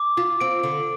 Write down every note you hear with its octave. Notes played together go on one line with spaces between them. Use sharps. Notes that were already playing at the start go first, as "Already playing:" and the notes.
Already playing: D6
F4
C4 D7
D3